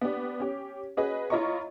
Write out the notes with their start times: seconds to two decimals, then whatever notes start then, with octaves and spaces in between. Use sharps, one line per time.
0.01 B3 D4 G4
0.40 C#4 G4
0.97 C#4 F#4 G#4 B4 D#5
1.30 E4 F4 C#5 D#5 A#5 C#6